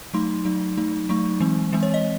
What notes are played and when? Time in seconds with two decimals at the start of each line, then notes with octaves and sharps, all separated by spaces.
0.14 F#3 A3 D#4 C6
0.45 F#3 A3 D#4
0.77 F#3 A3 D#4
1.09 F#3 A3 D#4 C#6
1.40 E3 G#3 C4
1.72 E3 G#3 C4
1.83 C#5
1.94 D#5